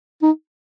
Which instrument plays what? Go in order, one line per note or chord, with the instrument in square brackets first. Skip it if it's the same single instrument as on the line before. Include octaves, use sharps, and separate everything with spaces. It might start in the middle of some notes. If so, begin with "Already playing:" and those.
[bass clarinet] D#4